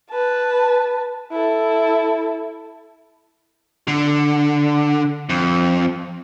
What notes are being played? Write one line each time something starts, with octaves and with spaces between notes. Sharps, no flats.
B4 A5
E4 A4
D3
F2